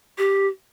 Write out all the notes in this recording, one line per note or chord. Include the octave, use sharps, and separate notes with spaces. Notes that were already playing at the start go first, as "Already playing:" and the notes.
G4